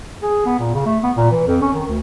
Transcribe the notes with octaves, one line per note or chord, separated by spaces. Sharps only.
G#4
B3
A#2
C#3
A3
B3
A#2
E3
F2
C#4
D#3
D2